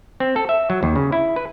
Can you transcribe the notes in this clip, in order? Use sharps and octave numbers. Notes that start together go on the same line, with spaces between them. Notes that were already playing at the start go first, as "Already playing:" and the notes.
C4
A4
E5
F#3
D#2
C#3
E4
B4